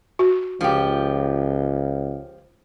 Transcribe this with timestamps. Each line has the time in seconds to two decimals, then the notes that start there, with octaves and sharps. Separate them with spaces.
0.19 F#4
0.61 C#2 F3 G4